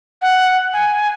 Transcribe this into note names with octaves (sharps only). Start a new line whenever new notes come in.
F#5
G#5